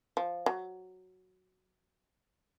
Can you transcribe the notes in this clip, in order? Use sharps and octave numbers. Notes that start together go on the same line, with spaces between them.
F3
F#3